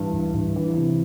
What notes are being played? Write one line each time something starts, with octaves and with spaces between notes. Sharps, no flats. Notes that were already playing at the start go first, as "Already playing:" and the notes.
Already playing: G2 E3
G2
G2
E3
C3